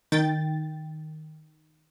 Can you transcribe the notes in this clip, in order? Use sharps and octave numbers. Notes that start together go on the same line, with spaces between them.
D#3 G5 A6